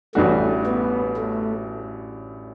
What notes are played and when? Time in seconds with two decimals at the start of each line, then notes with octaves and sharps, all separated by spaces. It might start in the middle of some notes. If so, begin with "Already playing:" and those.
0.15 A1 A2 G3 A3 D4 F#4
0.66 B3
1.17 A3